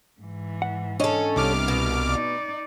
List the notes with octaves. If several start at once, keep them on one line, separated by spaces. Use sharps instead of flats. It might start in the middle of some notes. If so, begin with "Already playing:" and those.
G#2 E3
F#5
C#4 D4 A4 D#5
C2 B3 C4 D6 F6
B2
D#4 D5